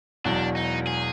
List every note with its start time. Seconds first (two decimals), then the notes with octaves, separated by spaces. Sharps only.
0.25 E1 E2 B2 F#3 D4
0.56 D#4
0.87 G#4